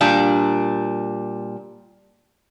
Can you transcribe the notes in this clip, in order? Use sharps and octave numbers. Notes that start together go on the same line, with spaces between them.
A#2 G3 D4